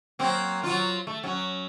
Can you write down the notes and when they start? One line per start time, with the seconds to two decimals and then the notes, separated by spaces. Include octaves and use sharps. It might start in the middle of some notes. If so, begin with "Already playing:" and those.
0.19 F#3 A#3 C4
0.63 F#3 F4
1.07 A3
1.23 F#3 C#4